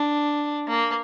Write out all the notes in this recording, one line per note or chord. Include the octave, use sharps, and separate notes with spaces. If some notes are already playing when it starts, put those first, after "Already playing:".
Already playing: D4
A#3